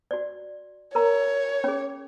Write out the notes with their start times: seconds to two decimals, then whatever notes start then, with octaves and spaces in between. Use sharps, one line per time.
0.11 F#4 D5
0.95 A#4 C#5 A#5
1.64 C#4 G#4